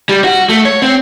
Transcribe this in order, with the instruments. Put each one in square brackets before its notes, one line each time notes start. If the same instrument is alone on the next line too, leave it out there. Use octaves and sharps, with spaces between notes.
[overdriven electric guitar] G3
F#4
A3
C#5
C4